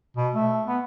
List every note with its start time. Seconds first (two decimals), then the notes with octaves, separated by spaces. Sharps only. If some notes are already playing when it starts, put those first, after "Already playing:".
0.17 B2
0.34 A3
0.67 B3